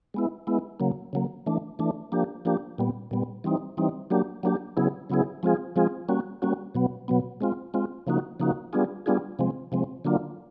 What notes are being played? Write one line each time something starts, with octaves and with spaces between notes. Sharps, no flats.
G#3 B3 E4
G#3 B3 E4
C#3 F#3 A#3
C#3 F#3 A#3
E3 A3 D4
E3 A3 D4
F3 A#3 D4 G4
F3 A#3 D4 G4
A#2 G3 B3
A#2 G3 B3
E3 G3 C4 D#4
E3 G3 C4 D#4
F#3 A#3 D4 G4
F#3 A#3 D4 G4
C#3 F#3 B3 E4 G#4
C#3 F#3 B3 E4 G#4
F3 G#3 C4 F4 G#4
F3 G#3 C4 F4 G#4
G3 A#3 C#4 F#4
G3 A#3 C#4 F#4
B2 F#3 B3
B2 F#3 B3
G#3 C4 F4
G#3 C4 F4
C#3 F3 A#3 D#4 F#4
C#3 F3 A#3 D#4 F#4
G3 B3 D4 F4 G#4
G3 B3 D4 F4 G#4
C3 F3 G#3 C4
C3 F3 G#3 C4
D3 F#3 A#3 D4 F4